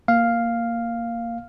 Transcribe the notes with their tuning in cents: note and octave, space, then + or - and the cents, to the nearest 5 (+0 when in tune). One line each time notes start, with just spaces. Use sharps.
A#3 -5 F5 +0